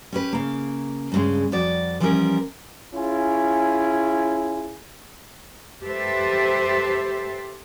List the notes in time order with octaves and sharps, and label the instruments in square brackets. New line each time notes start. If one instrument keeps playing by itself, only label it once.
[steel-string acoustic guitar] C#4 G4 B4
C#3 A#3
G2 C#3 G#3
F2 F#4 D5
E3 F3 G3 B3 C#4 A#4
[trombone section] C#4 E4 F4 G#4
[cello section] G4 A4 B4 C5 E5